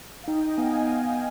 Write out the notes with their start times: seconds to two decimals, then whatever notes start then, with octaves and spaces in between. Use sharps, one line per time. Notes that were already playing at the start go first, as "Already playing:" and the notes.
0.24 F5
0.28 D#4 D#5 G5
0.57 B3 F5 G#5